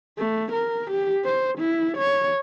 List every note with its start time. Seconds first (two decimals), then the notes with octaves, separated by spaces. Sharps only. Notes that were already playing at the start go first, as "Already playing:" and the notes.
0.18 A3
0.53 A#4
0.91 G4
1.24 C5
1.59 E4
1.98 C#5